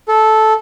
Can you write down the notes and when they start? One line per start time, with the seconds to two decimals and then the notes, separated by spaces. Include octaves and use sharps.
0.08 A4